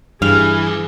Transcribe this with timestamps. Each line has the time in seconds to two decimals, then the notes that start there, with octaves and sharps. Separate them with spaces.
0.22 G2 E3 G#4 F5